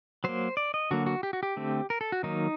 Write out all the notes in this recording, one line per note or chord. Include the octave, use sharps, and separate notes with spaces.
F#3 A#3 C5
D5
D#5
D3 F#3 A#3 F#4
F#4
G4
F#4
G4
D3 A3 C4
A#4
A4
F#4
D#3 F#3 A#3 D#4